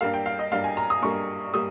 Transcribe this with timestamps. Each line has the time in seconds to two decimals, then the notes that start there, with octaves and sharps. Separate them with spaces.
0.01 G2 G3 A#3 F5
0.14 G5
0.26 F5
0.39 D#5
0.52 G2 G3 A#3 F5
0.64 G#5
0.77 A#5
0.90 D#6
1.02 G2 G3 A#3 C#6
1.54 G3 A#3 D#6